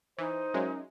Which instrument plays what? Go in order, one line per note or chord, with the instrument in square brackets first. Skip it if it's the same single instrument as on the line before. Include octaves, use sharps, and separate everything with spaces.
[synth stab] E3 [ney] D#4 [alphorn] C5
[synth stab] F#3 G#3 [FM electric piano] C#4 A#4 E5